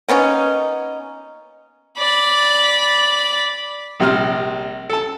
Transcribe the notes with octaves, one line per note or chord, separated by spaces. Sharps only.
A#3 B3 C#4 D#4
D5 B5
A#1 C3 G3 F6
A4 A5